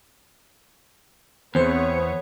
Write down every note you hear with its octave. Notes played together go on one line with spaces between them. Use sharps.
E2 B3 C4 G#4 C5 C#5 C#7